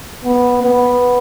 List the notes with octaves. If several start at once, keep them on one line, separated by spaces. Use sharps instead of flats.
B3
B3